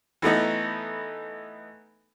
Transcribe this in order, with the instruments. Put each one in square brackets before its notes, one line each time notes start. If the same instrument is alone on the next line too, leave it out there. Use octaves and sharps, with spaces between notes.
[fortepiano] E3 A3 B3 D#4